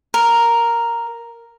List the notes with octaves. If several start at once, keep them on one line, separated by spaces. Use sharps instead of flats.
A#4